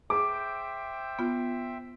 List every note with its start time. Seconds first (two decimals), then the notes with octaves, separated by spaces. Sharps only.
0.10 G#4 C5 E5 G5 D6
1.19 B3 F4